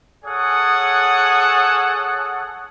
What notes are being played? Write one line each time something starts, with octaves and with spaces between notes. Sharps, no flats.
G#4 A4 C#5 F#5 G#5 D#6